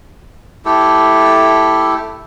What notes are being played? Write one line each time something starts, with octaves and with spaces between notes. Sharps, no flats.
A3 E4 G4 A4